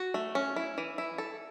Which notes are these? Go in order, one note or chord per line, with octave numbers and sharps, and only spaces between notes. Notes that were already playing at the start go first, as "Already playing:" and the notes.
Already playing: F#4
A3
C#4
E4
E3
E4
A4